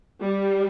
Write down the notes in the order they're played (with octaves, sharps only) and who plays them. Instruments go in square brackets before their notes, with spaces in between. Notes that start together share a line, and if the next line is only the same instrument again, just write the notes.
[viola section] G3